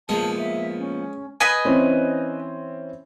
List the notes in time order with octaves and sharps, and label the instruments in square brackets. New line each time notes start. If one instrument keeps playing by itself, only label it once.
[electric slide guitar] F3 A#3 B3 [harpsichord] G#3 [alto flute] A5
[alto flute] E5
C#4
[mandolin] B4 D#5 G#5
[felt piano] E3 C4 C#4